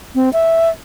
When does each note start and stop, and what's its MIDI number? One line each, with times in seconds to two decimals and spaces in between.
0.15 0.32 60
0.33 0.69 76